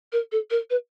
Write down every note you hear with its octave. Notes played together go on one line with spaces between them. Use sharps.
A#4
A4
A#4
B4